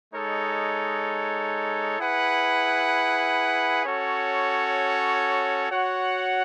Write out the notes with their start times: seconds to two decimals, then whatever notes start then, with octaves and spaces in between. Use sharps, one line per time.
0.14 G#3 D#4 A4 C#5
2.00 E4 G#4 B4 F#5
3.85 C#4 F#4 A4 C#5
5.71 F#4 C#5 F#5